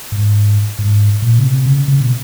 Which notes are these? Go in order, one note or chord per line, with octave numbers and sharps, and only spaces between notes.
G#2
G#2
A#2
C#3
C3
C#3
C#3
B2